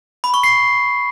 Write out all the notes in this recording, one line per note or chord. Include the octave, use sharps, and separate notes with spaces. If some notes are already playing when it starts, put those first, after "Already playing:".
B5
C#6
C7